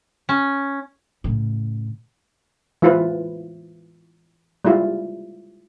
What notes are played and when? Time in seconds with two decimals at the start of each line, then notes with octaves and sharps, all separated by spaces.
0.29 C#4
1.24 A2 C#3
2.82 E3 G#3 E4 F4 B4 C5
4.65 G3 G#3 E4 F4